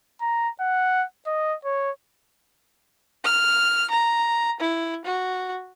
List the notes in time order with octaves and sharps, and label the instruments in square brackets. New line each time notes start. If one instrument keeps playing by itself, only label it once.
[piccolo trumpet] A#5
F#5
D#5
C#5
[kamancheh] F6
A#5
E4
F#4